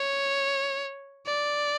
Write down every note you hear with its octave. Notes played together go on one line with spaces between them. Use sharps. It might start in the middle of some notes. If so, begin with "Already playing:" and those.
Already playing: C#5
D5